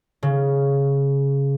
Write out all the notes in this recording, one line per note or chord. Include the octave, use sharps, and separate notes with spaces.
C#3